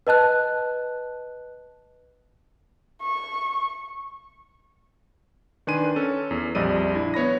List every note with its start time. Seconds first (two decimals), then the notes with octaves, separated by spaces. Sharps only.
0.07 B4 D#5 A5 F#6
3.02 C#6
5.67 D#3 D4 B4 G#5 C6 D#7
5.96 C#4 A4
6.31 E2
6.55 A#1 F2 G3 D5 D#5 D#7
6.95 D4 E4
7.14 B3 C#5 B5 A#6